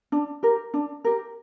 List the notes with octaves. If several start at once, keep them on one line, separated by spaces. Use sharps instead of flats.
D4
G4 A#4
D4
G4 A#4